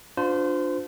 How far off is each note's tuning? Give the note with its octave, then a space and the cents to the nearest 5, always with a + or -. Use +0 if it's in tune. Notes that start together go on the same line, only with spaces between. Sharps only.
D4 +0 F4 +25 C5 -30